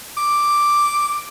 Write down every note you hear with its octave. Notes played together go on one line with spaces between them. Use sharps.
D6